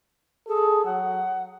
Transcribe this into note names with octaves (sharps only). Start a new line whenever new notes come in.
G#4 A4
F#3 F#5